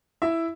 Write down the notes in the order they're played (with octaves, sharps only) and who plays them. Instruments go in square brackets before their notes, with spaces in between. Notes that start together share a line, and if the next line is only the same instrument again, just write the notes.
[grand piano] E4 E5